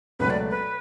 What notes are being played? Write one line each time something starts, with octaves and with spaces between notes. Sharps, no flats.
C#2 B2 F#3 A3 C#4 B4
D5
B4